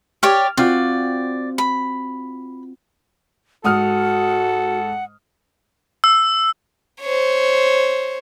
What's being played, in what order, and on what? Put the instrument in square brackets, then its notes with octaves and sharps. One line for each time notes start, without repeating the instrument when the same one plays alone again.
[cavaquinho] G4 C#5 D5 [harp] F6
[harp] C4 F4 F#4 [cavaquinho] D5
[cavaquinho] B5
[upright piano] G#2 D#6 F6 [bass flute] F#4 [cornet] A4 [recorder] F#5
[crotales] E6
[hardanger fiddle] C5 C#5